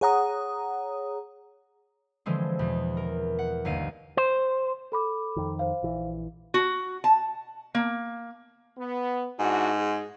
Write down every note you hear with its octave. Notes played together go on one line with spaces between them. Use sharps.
G#4 C#5 F#5 A#5 D#6
D3 E3 F3 G#3 C4
E2 B2
A#4
F#5
G1 D#2 F5 D#7
C5
A4 B5 D6
F2 D#3
C5 F5
A#1 E3
F#4
A5
A#3
B3
G#2 D4 E4 F#4
G#4